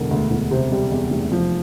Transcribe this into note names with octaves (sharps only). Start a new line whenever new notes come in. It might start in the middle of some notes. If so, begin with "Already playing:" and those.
Already playing: E1 D3 A#4
D2
E1
C3 C5
G3
E2
F1
F3